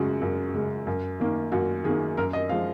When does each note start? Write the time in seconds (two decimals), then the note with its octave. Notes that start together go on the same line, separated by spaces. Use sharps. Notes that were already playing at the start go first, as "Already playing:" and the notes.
Already playing: F#2 C#3 G#3 F#4
0.22 F#2
0.54 C#3 G#3
0.87 F#2
1.20 D#3 A#3
1.52 F#2 F#4
1.84 D#3 A#3 G#4
2.17 F#2 A#4
2.33 D#5
2.49 F3 G#3 F5